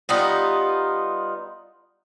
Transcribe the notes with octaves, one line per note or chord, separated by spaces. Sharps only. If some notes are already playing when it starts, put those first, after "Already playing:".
G3 B3 D#4 F4